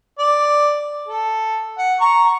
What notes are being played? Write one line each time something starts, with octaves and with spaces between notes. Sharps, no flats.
D5
A4
F#5
A#5 C#6